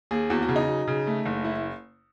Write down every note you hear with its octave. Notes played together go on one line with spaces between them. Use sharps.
D#2 G#4
E2 F#4
F#4
C#3
D#4
F#3
C#3
A3
F#1
E4